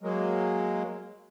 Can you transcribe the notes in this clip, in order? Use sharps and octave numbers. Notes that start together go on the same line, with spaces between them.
F#3 G#3 A#3